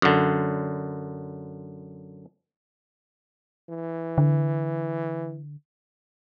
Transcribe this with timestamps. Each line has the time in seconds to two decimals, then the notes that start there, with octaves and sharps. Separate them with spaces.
0.02 F#2 D3
3.70 E3
4.18 D3